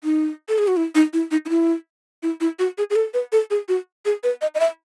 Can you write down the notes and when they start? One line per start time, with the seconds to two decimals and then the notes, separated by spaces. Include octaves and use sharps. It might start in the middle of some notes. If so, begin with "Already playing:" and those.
0.04 D#4
0.49 A4
0.58 G#4
0.68 F#4
0.77 E4
0.95 D#4
1.13 E4
1.31 D#4
1.45 D#4
1.50 E4
2.23 E4
2.41 E4
2.59 F#4
2.78 G#4
2.90 G#4
2.96 A4
3.14 B4
3.32 A4
3.50 G#4
3.68 F#4
4.05 G#4
4.23 B4
4.42 D#5
4.55 D#5
4.60 E5